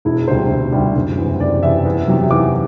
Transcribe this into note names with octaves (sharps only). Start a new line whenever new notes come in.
E1 E4
D2 C3 G3 C5
E1
D2 C3 G3
F#1
E2 C3
F#1 D5
E2 C3 E5
E2
C3 F#3
E2 D6